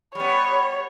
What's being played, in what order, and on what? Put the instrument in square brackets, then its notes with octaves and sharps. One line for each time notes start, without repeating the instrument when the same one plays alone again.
[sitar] G3 B3 [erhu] C#5